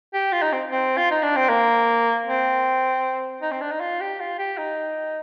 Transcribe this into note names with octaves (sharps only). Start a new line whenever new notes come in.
G4
F4
D#4
C4
C4
F4
D#4
D4
C4
A#3
C4
D#4
C4
D4
D#4
F4
G4
F4
G4
D#4